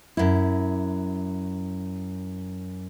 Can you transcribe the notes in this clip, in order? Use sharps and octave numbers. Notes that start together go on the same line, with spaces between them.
F#2 E4